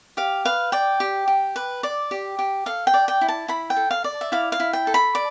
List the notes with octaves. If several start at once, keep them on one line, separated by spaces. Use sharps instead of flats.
G4 F5
B4 F5
D5 G5
G4
G4
B4
D5
G4
G4
A4 F5
G5
D5
G5
E4
A5
E4 B5
G5
A4
F5
D5
E5
E4 F5
F5
E4
G5
A4
B5
D5